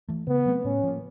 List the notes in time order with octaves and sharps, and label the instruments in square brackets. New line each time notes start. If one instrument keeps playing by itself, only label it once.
[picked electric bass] E3 A3
[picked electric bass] C#3 [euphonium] B3
[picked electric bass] F#3 A3 C4
[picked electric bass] A2 [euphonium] C#4
[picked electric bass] F3 A#3